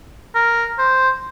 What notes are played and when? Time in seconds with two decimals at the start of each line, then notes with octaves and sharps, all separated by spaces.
0.35 A#4
0.79 C5